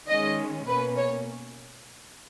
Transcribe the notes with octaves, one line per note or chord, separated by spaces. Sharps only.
D#3 G#3 C#4 D#5
B2 A#3 C#4 B4
C#5